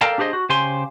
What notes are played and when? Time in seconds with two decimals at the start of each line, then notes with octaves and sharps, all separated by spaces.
0.01 A4 A#4 D5 F5 G5 A5
0.18 D4 G4 G#4 C5 D#5
0.33 F#4
0.49 C#3 G4 C5 G#5 C6